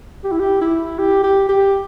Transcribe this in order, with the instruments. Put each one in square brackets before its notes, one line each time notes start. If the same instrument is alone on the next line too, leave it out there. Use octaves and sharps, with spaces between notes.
[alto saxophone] G4
E4
G4
E4
G4
G4
G4